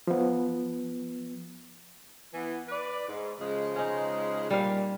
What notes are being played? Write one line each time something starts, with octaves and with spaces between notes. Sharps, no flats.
F3 B3
E3 B3
B4 D5
G#2
C#3 F3 G#3
C#4 D#4
A#2 G3 F5